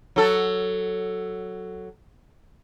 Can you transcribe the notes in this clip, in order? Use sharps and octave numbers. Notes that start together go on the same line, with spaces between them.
F#3 A4